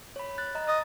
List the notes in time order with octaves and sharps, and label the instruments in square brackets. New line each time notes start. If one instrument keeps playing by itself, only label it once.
[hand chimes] C#5 B5
F#6 A6
D#5 A#5
[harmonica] D#5 [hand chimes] D#6 A6